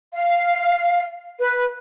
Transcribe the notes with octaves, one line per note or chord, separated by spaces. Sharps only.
F5
B4